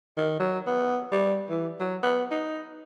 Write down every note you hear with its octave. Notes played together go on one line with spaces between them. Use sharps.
D#3
F#3
B3
G3
E3
F#3
B3
D#4